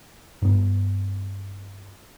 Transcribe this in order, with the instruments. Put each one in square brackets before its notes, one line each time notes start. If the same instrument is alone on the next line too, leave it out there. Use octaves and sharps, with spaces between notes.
[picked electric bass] G2 B3